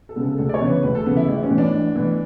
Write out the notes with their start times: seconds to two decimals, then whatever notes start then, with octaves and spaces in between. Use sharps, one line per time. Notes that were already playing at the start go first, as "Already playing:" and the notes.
0.09 A4
0.16 C#3 G#3 B3
0.23 A4
0.38 D2 A4
0.49 D5
0.54 C#5
0.60 C#3 E3 B3
0.68 B4
0.83 D2 B4
0.95 A4
1.06 C#3 E3 B3
1.17 E4
1.28 A1
1.43 C#4
1.50 A2 E3 B3
1.58 D4
1.74 A1
1.95 A2 E3 B3